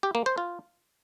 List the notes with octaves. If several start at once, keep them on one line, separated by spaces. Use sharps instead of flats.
G4
A#3
C5
F4